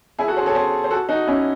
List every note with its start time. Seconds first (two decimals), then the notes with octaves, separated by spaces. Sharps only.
0.19 E4 G#4
0.28 F#4 A4
0.37 G#4 C5
0.46 A4 C#5
0.55 G#4 C5
0.84 C5
0.91 F#4 A4
1.09 D#4 F#4
1.27 C#4 E4